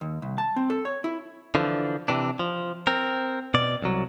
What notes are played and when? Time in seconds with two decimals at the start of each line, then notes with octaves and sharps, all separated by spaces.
0.01 D#2
0.22 C2
0.38 A5
0.56 C4
0.70 A4
0.85 C#5
1.04 E4
1.55 D3 E3 F3
2.08 C3 E3 D4
2.39 F3
2.87 C4 A#4
3.54 B2 D5
3.82 C2 F#3